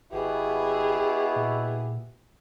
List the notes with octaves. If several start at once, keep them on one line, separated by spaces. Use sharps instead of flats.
G#1 B2 B3 E4 G4 G#4
A#2